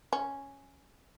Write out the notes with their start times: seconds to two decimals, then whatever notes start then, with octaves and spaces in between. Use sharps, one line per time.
0.13 C#4